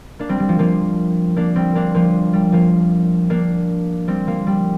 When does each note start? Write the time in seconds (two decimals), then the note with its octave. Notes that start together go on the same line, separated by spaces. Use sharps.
0.19 A#3 D4
0.29 G3 C4
0.40 G3
0.49 F3
0.59 F3 A#3
1.37 A#3 D4
1.56 G3 C4
1.75 A#3 D4
1.94 F3 A#3
2.33 G3
2.52 F3 A#3
3.30 A#3 D4
4.08 G3 C4
4.27 F3 A#3
4.47 G3